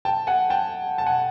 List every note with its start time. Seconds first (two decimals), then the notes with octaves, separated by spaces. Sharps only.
0.05 G5 A5
0.27 F#5 G#5
0.50 G5 A5
0.98 A5
1.06 F#5 G#5